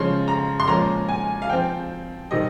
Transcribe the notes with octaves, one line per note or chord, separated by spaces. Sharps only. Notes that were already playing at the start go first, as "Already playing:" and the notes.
Already playing: C#3 F3 G#3 C#4 C6
A#5
C6
A#2 F3 G#3 C#4 A#5
G#5
F5
F3 C4 G5
C3 D#3 G3 D#5